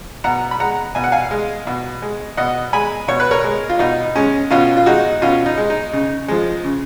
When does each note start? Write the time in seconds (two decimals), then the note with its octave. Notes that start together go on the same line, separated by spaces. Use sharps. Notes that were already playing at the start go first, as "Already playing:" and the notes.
0.24 B2 F#5 A#5
0.51 B5
0.60 G#3 F#5 A#5
0.95 B2 G#5
1.04 F#5
1.12 F5 G#5
1.31 G#3
1.67 B2
2.02 G#3
2.37 B2 D#5 F#5
2.73 G#3 G#5 B5
3.08 B2 C#5
3.20 B4
3.31 A#4 C#5
3.44 G#3
3.69 F4
3.79 B2 D#4
4.16 G#3 C#4
4.50 B2 C#4 F4
4.77 F4
4.86 G#3 D#4 F#4
5.22 B2 C#4 F4
5.46 D#4
5.57 G#3
5.70 D#4
5.93 C#3
6.28 F3 G#3
6.64 C#3